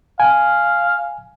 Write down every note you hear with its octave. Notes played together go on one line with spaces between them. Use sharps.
F5 G#5